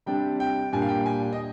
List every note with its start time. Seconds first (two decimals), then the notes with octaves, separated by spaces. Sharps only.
0.06 C3 G3 D4 G5
0.40 G5
0.73 A#2 G3 D4 G#5
0.82 F5
0.89 G5
1.06 G#5
1.33 D#5